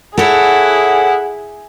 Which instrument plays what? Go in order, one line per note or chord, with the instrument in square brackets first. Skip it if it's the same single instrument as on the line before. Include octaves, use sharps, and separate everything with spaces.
[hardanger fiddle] E4 [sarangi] G#4 [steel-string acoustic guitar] A4 C#5 [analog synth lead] F#5